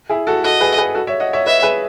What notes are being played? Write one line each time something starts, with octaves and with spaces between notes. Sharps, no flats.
E4 G#4
F#4 A4
F#4 A4 D#5
G#4 B4
G#4 B4
F#4 A4
C#5 E5
D#5 F#5
C#5 E5
B4 D#5 E5
G#4 B4